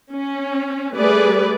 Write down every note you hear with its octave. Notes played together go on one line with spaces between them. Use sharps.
C#4
G3 A3 G#4 B4 D5